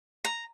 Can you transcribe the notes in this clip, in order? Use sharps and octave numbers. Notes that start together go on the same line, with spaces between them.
A#5